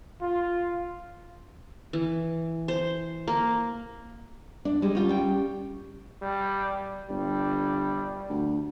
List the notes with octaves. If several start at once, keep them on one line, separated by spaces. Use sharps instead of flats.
F4
E3
C5
A#3
D4
G3 G#3
G3 C#4 F4 G4
G3 G5
G3
G1 G3
D2